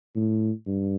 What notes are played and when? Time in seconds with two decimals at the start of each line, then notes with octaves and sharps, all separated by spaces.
0.16 A2
0.67 G2